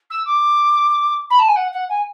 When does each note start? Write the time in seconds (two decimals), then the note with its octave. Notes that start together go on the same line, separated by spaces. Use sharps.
0.10 E6
0.25 D6
1.30 B5
1.39 A5
1.48 G#5
1.56 F#5
1.72 F#5
1.89 G#5